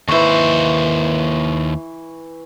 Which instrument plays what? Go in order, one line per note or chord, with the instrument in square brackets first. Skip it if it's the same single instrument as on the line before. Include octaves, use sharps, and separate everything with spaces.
[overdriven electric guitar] D#2 C5 [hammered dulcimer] E3 C#6